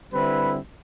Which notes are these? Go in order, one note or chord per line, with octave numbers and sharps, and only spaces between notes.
D3 G3 C4 E4 B4